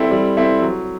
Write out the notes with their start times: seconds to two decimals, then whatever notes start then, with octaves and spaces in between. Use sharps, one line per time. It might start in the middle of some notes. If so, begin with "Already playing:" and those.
Already playing: G3 C4 E4 A4 E5
0.11 G3
0.37 C4 E4 A4 E5
0.62 F#3